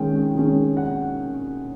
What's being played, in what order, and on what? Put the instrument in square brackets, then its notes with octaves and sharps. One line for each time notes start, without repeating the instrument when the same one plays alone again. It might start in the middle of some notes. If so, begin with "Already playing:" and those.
Already playing: [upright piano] D#3 G#3 C#4 G5
D#3 G#3 C#4
F#5